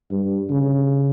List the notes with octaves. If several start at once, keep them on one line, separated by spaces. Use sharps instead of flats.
G2
C#3